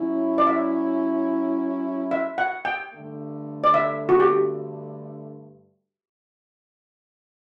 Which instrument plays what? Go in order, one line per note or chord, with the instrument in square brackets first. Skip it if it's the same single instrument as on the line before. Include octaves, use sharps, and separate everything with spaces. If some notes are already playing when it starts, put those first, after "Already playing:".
Already playing: [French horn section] F#3 C#4 E4
[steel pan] D5
E5
E5
F#5
G5
[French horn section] G2 D3 A3
[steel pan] D5
E5
F#4
G4